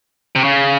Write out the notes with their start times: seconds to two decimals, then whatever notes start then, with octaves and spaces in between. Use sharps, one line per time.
0.36 C3
0.44 C#3